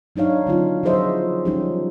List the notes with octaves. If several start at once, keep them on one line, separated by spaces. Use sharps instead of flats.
F#3 D4 D#4 C#5 F5
D3 F#3 B3 C#4 D#4 F4
F3 F#3 G#4 C5 D#5 E5
F3 G3 C#4 D#4 G4